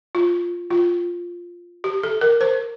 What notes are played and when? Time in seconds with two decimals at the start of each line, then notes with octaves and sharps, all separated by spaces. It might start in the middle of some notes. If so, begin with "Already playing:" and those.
0.15 F4
0.70 F4
1.84 G4
2.03 A4
2.21 A#4
2.41 C5